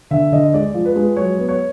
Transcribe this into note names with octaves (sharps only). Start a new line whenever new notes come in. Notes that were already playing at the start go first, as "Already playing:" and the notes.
D3 E5
D3 D#5
G#3 D5
F3
B4
G#3
F#3 C#5
B3
C#5